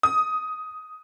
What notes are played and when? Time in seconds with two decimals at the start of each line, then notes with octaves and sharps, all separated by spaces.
0.03 D#6